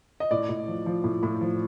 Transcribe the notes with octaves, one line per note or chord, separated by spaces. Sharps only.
D#5
A2 D5
A2
F3
F3
A2
A2
F3